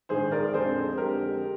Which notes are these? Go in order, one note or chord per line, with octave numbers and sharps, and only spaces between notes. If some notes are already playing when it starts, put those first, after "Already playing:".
A#1 G#2 D#3 G#4 C5
A#4 D5
F2 D3 G#3 C4 G#4 C5
F2 D3 G#3 C4 G4 A#4